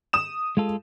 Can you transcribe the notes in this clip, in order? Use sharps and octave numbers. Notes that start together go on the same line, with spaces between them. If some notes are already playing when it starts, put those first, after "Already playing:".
D#6 E7
G#3 F4 A4